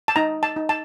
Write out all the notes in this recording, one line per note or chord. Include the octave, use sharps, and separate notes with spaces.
A5
D#4 A#5
A5
D#4
A5